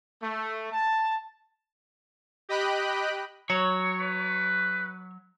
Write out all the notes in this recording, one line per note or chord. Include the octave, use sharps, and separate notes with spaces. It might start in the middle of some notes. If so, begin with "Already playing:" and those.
A3
A5
G4 D#5 G5 B5 F#6
F#3 C#5
B4